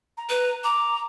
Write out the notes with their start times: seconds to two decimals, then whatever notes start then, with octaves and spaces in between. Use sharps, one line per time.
0.17 A#5
0.29 B4
0.64 A#5 D6